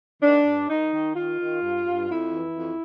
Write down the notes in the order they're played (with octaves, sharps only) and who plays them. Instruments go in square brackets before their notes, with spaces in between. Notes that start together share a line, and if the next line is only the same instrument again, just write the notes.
[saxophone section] D#3 D4
G2
D#3 D#4
D#3
D#3 F4
D#3
G2
G2
F2 E4
E3
F2